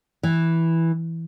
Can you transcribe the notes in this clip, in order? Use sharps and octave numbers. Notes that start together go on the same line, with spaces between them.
E3